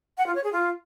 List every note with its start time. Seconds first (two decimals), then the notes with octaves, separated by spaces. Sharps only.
0.18 F#5
0.26 F4
0.35 C#5
0.44 G#4
0.52 F4